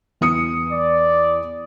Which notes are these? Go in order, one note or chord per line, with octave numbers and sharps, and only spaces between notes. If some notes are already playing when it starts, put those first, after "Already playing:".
E2 D#6 C#7
D5